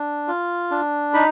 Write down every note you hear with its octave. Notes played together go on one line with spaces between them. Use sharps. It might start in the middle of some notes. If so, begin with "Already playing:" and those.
Already playing: D4
F4
D4
D#4 B5